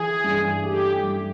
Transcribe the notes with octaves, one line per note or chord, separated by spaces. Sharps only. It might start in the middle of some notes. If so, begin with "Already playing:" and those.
Already playing: E3 G#4
G2
A3 G4
G2